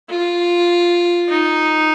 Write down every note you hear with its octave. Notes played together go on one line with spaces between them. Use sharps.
F4
D#4